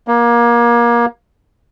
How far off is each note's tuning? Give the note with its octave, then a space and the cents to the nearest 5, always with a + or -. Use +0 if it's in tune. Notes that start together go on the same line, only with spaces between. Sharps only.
A#3 +25